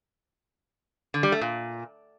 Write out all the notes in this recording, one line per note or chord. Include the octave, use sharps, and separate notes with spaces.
D3
G3
A3
A#2